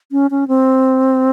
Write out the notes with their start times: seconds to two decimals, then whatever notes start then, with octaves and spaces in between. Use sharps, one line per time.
0.12 C#4
0.31 C#4
0.48 C4